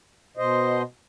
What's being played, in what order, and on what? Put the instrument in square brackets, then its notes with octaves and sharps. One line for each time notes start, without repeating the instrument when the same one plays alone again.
[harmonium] B2 C5 D#5